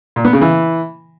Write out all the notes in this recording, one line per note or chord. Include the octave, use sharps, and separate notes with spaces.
A#2
B3
C#3
E3